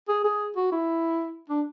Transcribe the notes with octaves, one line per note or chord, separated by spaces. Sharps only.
G#4
G#4
F#4
E4
D4